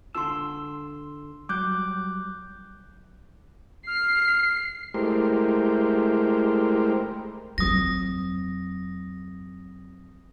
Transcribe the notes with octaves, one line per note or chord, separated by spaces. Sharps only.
D3 F4 A5 C6 E6
F#3 G3 D6 F#6 G6
F6 C7
G#3 A3 E4 G4 A#4 C5
F2 F#3 D#6 A#6